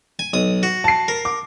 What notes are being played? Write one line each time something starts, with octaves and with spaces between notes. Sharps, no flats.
G#5
B1 D#6
F#4
A5 C7
A#4
D6